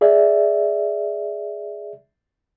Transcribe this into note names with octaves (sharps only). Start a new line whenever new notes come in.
G#4 D5 E5